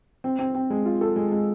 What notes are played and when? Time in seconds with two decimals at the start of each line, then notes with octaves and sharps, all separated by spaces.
0.24 C4
0.39 C4
0.55 C4
0.70 G#3
0.86 F4
1.01 A4
1.16 G#3
1.32 G#3